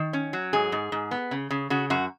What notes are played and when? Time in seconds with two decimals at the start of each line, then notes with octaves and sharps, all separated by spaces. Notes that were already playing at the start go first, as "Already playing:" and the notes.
Already playing: D#3
0.13 C#4
0.33 F#3
0.53 G#2 G#4
0.72 G#2
0.92 G#2
1.11 B3
1.31 C#3
1.51 C#3
1.70 C#3 F#4
1.90 F#2 F#4